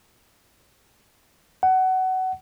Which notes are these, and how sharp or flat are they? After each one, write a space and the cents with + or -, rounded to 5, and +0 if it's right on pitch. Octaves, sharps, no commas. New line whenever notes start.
F#5 +20